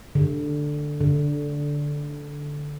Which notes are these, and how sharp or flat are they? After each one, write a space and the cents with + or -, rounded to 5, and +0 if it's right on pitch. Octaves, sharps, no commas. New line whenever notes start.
D3 +5
D3 -10